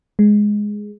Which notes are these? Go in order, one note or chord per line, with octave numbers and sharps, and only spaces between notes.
G#3